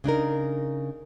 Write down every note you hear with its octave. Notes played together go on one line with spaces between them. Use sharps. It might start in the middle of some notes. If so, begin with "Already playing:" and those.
C#3 D4 D#4 A#4